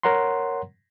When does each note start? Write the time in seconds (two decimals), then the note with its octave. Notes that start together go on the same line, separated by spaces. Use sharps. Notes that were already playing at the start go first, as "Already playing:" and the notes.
0.03 A#4 C#5 F#5 A#5 C6